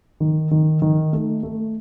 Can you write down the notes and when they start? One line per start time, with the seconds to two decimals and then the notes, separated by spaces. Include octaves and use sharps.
0.20 D#3
0.51 D#3
0.82 D#3
1.13 A3
1.43 A3